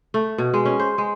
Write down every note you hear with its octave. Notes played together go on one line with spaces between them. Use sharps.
A3
B2
G#3
C#4
C5
G#3